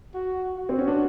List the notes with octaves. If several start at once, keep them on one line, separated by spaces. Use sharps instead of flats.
F#4
F#4
C4
C#4
D4